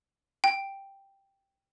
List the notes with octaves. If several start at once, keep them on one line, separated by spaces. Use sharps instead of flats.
G5